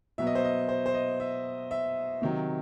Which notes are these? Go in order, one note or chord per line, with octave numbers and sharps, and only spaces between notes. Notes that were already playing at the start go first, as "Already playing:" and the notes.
B2 F#3 B3 E5
D#5
C5
D#5
C5
C5
D#5
E5
E5
C3 D#3 F#3